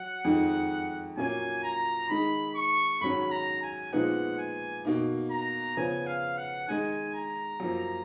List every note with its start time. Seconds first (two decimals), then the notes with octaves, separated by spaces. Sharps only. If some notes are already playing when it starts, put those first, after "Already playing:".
Already playing: F#3 F#5
0.25 F2 D#3 G#3 D#4
1.17 A#2 F#3 A#3 C#4 G#5
1.64 A#5
2.09 D#3 G#3 D#4 B5
2.55 C#6
3.01 G#2 D#3 F#3 C#4 B5
3.32 A#5
3.63 G#5
3.93 A#2 F3 G#3 B3 D#4 F#5
4.38 G#5
4.85 B2 A#3 D#4
5.31 A#5
5.77 C#3 F3 B3 G#5
6.07 F5
6.37 F#5
6.68 D#3 G#3 D#4 G#5
7.15 A#5
7.60 F#2 F3 A#3